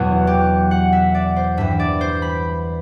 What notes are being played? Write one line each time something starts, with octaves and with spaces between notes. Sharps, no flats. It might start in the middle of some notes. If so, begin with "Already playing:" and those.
Already playing: E2 B2 F#3 F#4
G4
F#5
E5
D5
C5
G2 E3 E5
D5
C5
B5